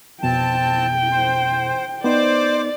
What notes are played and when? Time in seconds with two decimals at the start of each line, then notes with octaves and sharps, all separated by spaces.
0.23 F2 B2 C4 G5 A5
1.11 C5
2.04 B3 D#4 C5 D5 D6